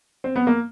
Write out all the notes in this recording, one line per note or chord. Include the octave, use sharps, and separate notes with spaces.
C4
B3
A#3